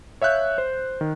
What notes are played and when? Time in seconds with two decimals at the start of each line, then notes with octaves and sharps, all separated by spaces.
0.22 C#5 E5 F5 F#6 G6
0.58 C5
1.01 D#3